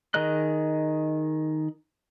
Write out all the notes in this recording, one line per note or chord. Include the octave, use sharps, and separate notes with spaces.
D#3 G#4 A#4 D#5 F#6